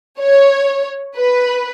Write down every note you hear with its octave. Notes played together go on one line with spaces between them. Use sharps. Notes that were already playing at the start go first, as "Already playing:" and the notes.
C#5
B4